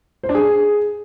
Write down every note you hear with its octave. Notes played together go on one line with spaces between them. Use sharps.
C5
D4
G#4